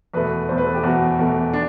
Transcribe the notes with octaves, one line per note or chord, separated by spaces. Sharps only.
E2 B2 A3 B4
E2 B2 A3 C5
B4
A4
G4
E2 B2 A3 F#4
E2 B2 A3
D4